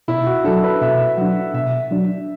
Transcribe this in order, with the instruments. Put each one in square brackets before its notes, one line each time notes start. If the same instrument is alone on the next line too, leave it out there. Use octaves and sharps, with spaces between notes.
[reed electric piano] B2 [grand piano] E4
[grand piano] F#4
[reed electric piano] F#3 D4 [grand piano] A4
[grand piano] B4
[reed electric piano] B2 [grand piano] E5
[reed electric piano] F#3 D4 [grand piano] F#5
[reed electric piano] B2 [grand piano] E5
[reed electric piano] F#3 D4